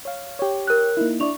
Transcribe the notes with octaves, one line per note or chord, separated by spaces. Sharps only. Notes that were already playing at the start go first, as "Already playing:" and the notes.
C#5 F5
G4 C#5
A#4 F#6
A#3 D#4 E4
D4 E4 D5 C#6 F7